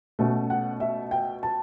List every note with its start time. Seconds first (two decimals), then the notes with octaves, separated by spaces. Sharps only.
0.19 B2 A3 C#4
0.50 F#5
0.80 E5
1.11 G5
1.43 A5